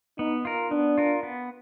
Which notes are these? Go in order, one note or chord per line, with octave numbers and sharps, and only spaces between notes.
B3 D#4
F4 A#4
B3 D4
F4 A#4
B3